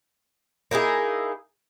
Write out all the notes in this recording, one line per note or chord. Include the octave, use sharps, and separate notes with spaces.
A#3 D#4 E4 G#4